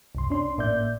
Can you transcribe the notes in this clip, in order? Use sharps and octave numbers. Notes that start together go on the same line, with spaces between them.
C2 F#2 C6
C#4 D4 C6
G#1 A2 A#3 D5 E5 G6